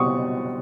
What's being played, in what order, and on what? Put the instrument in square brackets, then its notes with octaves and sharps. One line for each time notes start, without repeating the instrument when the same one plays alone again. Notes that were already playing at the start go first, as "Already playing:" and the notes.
Already playing: [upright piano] B2 G3 C4 C#6 D#6